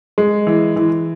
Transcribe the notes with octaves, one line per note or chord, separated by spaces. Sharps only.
G#3
E3
E3